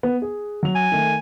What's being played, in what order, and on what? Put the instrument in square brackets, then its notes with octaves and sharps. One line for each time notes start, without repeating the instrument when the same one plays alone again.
[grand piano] B3
G#4
F#3 F7
[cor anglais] G#5
[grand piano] D#3 A3